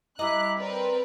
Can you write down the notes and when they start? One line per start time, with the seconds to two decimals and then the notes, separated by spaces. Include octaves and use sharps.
0.19 G3 E4 D#5 A#5 D6 F#6
0.58 C4 A#4 B4 D5